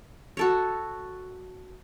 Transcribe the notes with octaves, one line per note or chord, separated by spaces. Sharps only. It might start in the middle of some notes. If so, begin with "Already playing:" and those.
F#4 A4 C#5